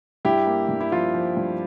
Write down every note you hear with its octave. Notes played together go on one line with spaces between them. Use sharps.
G2 E4 G4
A#3
G2
E4
F3 F4
F3
G2